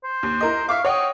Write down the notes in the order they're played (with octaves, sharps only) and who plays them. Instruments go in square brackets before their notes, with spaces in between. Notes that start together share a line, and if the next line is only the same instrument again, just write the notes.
[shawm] C5
[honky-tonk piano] D#2
E4 A#4 D#5
[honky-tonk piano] E5 C#6 D6 [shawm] F5
[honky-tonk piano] C#5 F#5 G5 [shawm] D#5